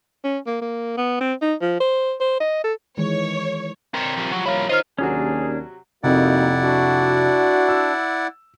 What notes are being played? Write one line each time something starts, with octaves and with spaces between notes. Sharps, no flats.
C#4
A#3
A#3
B3
C4
D#4
F3
C5
C5
D#5
A4
D#3 E3 G#3 C#5
C4 A#4 C5 C#5
F3 G3
F#3
E4 A#4 C#5 F5
F4 A#4 C5 D#5 F5 F6
D#2 C3 F#3 C#4 D4 F#4 G#4
F2 C3 A#3 D#4 E4 F#4 D5 F#5
D4 F#4
E6